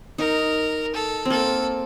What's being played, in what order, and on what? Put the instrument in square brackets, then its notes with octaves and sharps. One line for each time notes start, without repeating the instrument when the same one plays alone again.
[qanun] D#4 [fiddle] A#4
[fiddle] A4
[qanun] A#3 C4 [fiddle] A4